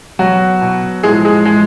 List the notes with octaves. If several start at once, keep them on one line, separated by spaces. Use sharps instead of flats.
B2 F#3 F#4
B2
A2 F3 G#3 G#4
G#3 G#4
A2 F3 G#3 G#4